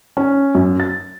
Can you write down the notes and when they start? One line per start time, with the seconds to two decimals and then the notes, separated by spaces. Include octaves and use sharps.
0.17 C#4
0.55 F#2
0.80 A6